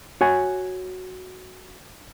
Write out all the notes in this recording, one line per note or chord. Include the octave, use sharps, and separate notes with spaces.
F#4 C#5 G#5